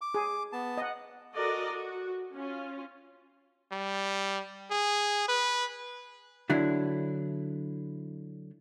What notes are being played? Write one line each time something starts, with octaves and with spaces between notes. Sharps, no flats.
D6
G#4
B3 A5
D#5 F#5
F#4 A4 A#4 D5 D#5
F#4
C#4 F4
G3
G#4
B4
D3 F#3 D4 E4